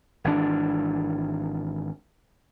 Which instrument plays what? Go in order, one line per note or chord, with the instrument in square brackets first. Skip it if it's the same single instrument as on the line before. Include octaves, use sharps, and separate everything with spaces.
[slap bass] G#1 E3 D4